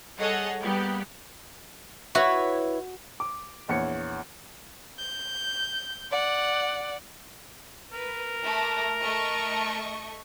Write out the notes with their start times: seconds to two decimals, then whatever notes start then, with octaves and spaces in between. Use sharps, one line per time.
0.19 G3 G#4 A4 C#5 D#5 F#5
0.60 G3 A#3 B3 G4
2.15 E4 F#4 B4 C#5
3.20 D6
3.68 A#1 E2 C#5 C#7
4.99 G6
6.11 D5 F#5
7.92 A#4 B4
8.44 A3 D6 A#6
9.01 A3 D#5 C#6